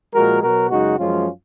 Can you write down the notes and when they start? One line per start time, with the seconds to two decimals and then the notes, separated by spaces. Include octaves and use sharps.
0.14 A#2 F3 G#3 F#4 A#4
0.42 B2 F#3 F#4 A#4
0.70 F#2 C#3 G#3 D#4 F#4
0.99 F#2 F3 G#3 C#4 F4